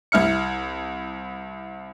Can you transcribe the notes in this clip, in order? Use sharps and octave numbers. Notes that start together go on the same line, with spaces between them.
C2 E4 F6 C#7